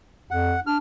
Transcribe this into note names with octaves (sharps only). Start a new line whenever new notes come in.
F2 F#5
D4 F6